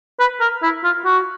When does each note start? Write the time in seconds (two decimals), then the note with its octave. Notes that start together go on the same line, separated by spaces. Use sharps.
0.20 B4
0.41 A#4
0.62 E4
0.84 F4
1.05 F#4